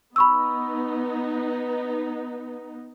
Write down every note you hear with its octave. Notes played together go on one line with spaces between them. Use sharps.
B3 D#4 B5 C#6 E6